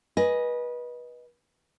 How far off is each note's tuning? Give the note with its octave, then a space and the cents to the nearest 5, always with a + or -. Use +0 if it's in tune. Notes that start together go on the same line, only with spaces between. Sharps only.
B4 -25 D#5 +0 G#5 +0